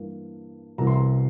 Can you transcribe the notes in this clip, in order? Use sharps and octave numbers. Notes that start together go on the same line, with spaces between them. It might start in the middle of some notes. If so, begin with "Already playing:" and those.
Already playing: G2 E3 A#3
C2 C3 E3 A#5
C6
A#5